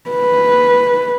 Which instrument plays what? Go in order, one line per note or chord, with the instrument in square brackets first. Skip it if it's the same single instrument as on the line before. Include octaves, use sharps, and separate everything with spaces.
[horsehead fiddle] B4